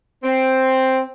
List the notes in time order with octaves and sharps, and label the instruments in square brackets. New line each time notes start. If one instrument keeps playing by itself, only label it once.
[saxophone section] C4